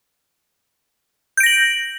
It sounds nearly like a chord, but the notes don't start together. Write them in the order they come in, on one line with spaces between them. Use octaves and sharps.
G6 D7 A#6 F#7